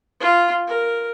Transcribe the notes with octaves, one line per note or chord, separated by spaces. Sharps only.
F4
A#4